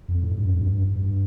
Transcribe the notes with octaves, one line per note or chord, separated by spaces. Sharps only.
F2
A2
G2
F2
G2
G2